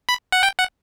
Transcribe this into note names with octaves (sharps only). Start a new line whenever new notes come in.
B5
F#5
G5
F#5